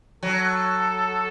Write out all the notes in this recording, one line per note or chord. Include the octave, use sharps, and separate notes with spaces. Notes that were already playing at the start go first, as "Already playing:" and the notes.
F#3 A4